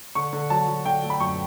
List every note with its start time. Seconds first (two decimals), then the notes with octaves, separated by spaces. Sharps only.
0.15 D3 C#6
0.33 D3
0.50 F#3 A5
0.68 F#3
0.85 D3 G5
1.03 A3
1.10 B5
1.20 F#2 C#6